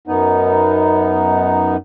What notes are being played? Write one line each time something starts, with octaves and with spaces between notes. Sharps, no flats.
F#2 B3 D#4